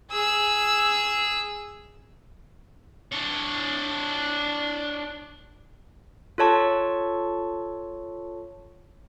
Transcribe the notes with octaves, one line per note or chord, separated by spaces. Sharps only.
G#4 E6
D4 C#5
F4 A4 C#5 A5 C#6